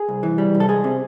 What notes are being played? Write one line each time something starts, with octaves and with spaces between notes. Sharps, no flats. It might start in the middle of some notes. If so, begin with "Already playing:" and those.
Already playing: G#4
C2
E3
G3
C2
A4
G#3 G#4
C3